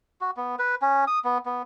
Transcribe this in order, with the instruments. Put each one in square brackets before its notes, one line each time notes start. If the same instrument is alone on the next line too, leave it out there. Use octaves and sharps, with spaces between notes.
[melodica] F#4
B3
B4
C#4
D#6
B3
B3